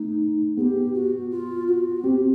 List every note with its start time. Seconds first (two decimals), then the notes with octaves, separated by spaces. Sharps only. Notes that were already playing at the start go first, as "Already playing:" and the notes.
Already playing: A3 D#4
0.57 B3 G4 G#4
0.94 F#4
1.31 F4
1.67 F#4
2.04 C4 G4